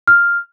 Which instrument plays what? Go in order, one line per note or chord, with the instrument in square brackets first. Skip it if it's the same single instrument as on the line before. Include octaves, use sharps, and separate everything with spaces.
[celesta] F6